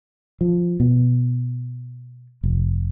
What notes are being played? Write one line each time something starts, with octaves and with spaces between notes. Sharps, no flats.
F3
B2
F1